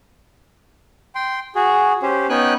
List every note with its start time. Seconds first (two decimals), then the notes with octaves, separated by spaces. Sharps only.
1.15 G5 C6
1.55 F#4 G#4
2.02 C#4 G4 C5
2.29 B3 C#4 D#4 G5 G#5 F#6